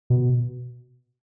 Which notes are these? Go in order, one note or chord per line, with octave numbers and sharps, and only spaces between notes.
B2